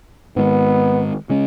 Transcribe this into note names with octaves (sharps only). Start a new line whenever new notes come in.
G#2 D#3 G#3 B3
C#3 G#3 C#4